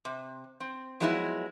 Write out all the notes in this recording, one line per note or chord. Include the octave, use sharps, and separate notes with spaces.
C3
C4
F3 F#3 G#3 B3 D#4 E4